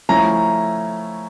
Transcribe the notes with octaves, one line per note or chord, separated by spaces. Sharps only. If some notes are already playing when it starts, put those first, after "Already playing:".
F3 A3 C#4 E4 A#5